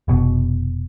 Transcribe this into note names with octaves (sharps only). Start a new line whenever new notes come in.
F1 B2